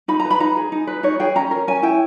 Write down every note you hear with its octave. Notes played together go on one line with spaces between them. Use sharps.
D#4 B5
A#5
B4
B5
D#4 A#5
G#4
D#4
B4
D#4 C#5
G#4 G5
C#4 A#5
A#4
C#4 G#5
E4 G5